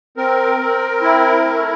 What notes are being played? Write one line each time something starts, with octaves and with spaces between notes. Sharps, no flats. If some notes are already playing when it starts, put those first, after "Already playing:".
C4 A#4
C4
E4
A3